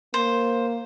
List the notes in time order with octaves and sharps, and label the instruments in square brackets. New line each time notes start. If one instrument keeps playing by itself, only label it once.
[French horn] A#3 [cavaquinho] C5